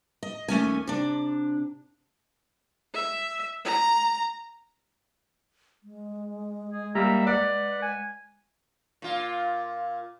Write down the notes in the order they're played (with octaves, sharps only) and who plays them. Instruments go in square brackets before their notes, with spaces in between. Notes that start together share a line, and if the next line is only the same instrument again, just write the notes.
[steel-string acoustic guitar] D#5
D#2 A3 C#4 G#5
C3 D4
[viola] E5
A#5
[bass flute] G#3
[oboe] G#4
[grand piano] G3 A#3 [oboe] E5 [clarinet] A#5
[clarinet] B4 [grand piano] D5 [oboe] F#5
[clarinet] G#5
[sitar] A#2 F4